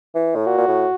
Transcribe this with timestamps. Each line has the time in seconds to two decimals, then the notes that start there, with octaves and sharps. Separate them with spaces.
0.15 E3
0.36 A2
0.47 A#2 F#4
0.58 A#2
0.68 A2